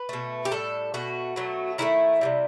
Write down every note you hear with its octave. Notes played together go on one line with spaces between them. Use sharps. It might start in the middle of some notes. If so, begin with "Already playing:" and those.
Already playing: B4
B2 A3
G4
A2 G3 A4
B2 A3 F#4
B2 F#3 A3
D#3 F#3 A3 E4
C3 E3 G3